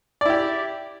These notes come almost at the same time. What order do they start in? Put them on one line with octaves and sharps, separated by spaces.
D5 E4 G4